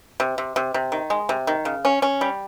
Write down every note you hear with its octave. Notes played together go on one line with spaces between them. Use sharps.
C3
C3
C3
C3
D#3
G#3
C3
D#3
C#3
C#4
C#4
G3